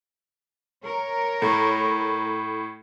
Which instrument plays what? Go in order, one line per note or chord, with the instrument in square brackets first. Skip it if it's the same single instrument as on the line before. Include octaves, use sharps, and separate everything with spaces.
[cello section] A#4 C#5
[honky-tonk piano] A2